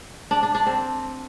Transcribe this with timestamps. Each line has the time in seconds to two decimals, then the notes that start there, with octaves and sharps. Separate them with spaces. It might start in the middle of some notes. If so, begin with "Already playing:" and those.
0.31 D4
0.43 D4
0.55 D4
0.66 C4